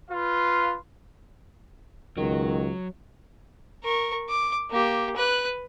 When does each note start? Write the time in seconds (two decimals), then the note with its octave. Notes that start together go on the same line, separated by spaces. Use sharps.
0.11 F4 B4 F5 C6
2.17 C#2 D#3 F#3
3.84 A#4 C#6
4.29 D6
4.71 A#3 G4
5.16 B4 F#6